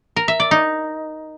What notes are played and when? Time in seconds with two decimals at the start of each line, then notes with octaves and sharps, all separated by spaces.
0.16 A#4
0.28 E5
0.40 D5
0.51 D#4